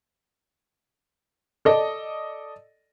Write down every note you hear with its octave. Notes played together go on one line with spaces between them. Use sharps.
A4 D5 D#5